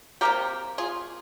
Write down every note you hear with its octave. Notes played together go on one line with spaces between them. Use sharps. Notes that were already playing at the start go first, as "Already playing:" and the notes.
C3 G3 A#3 G4 A#4
F4 G#4